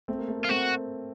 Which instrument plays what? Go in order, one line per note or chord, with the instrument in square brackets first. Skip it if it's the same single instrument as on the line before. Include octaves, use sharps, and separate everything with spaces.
[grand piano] A3 C4
A#3
A3
[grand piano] A#3 [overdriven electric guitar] F4
[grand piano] A3 C4 [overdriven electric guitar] F#4